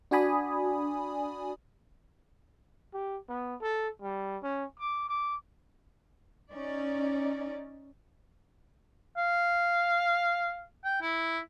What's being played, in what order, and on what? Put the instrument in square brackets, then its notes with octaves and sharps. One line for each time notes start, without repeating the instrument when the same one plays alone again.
[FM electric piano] D4 F#4 D5 G#5 B5 D#6
[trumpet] G4
B3
A4
G3
C#4
D6
D6
[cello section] C#4 D#4 D5
[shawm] F5
G5
E4